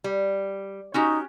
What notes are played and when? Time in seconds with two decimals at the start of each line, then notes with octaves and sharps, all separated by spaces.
0.04 G3
0.94 C#4 D#4 F#4 G4